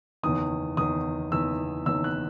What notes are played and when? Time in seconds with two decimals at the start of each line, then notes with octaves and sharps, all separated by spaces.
0.23 F#1 E2 D#3 D#6
0.77 F#1 E2 D#3 D#6
1.32 F#1 E2 D#3 E6
1.86 F#1 E2 D#3 E6
2.04 F#6